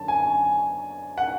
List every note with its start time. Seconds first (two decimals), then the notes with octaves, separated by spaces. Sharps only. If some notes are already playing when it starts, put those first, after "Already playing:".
Already playing: F#2 D3 F#3 A5
0.08 G#5
1.18 F#5